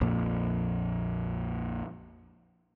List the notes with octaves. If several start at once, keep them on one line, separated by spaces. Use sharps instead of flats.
A#1 F2 A#2